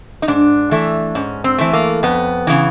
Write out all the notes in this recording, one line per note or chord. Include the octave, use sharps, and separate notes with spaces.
D#4
G#2 D4
E3 A3
G#2 C#4
C4
E3 A3
A#3
F2 B3
C#3 E3